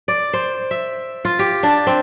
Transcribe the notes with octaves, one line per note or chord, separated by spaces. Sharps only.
D5
C5
E5
F4
G4
D4
C4